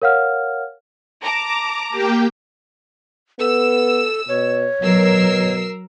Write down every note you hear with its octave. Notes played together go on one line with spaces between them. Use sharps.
A#4 C#5 F5 F#5 F6
A5 A#5 D6
A#3 G4 G5
B3 A4 E6
B2 C#5
B2 F#3 A#4 E6 C7